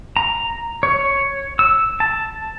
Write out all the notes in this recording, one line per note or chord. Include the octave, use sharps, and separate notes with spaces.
A#5
C#5
E6
A5